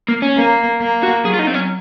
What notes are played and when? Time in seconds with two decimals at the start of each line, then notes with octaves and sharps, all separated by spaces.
0.08 A#3
0.22 C#4
0.37 A#3
0.81 A#3
1.03 F#4
1.25 F#3 G#4
1.34 F4
1.39 D#4
1.47 C4
1.54 C#4